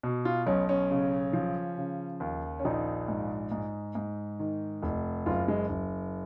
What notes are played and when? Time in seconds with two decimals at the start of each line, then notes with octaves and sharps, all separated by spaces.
0.03 B2
0.25 F4
0.47 B1 C#4
0.69 C#4
0.91 C#3
1.33 F3
1.78 C#3
2.20 D#2
2.59 C#4
2.65 A#1 D#4
3.08 G#2
3.52 G#2
3.95 G#2
4.39 D#3
4.82 F1
5.26 F#1 F4
5.48 G#3
5.69 F#1